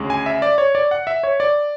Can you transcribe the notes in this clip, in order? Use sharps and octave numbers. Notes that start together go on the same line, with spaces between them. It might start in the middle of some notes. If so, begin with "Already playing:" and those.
Already playing: D2 C#3 G#3
G#5
E5
D5
C#5
D5
F#5
E5
C#5
D5